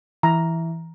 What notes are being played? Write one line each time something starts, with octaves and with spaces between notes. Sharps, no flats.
E3 A#5